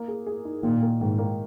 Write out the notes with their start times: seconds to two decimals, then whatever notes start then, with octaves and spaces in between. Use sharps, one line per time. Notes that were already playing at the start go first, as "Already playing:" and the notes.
Already playing: A#3
0.08 G#4
0.26 G#4
0.45 D#4
0.63 A#2 D#3
0.82 A#3
1.01 G#2 D#3
1.18 A#3